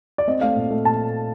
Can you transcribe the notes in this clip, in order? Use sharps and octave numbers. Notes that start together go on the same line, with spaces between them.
D5
C4 D#5
A3 F5
A#2
A3
A#2 A5